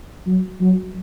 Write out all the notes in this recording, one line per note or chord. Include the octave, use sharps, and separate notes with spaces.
F#3
F#3